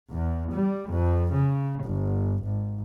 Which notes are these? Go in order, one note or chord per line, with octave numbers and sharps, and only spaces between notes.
E2
G3
F2
C#3
G1
G#1